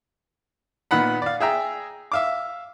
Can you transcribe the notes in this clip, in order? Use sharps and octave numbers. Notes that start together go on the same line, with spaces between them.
A#2 D#3 B3 D#4 F#5 B5
D5 F5
G#4 E5 G5 A#5
E5 F5 D6